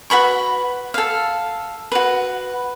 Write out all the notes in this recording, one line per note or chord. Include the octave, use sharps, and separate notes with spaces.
F#4 B4 B5 C#6
A4 F5
F#4 B4